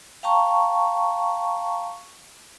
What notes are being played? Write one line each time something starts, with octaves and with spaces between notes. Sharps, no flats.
F5 G5 A5 A#5 C#6